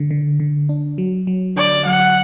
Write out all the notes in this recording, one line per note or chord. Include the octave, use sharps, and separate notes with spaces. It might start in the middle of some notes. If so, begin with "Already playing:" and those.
Already playing: D3
D3
D3
D4
F#3
F#3
D3 D5
F#3 F#5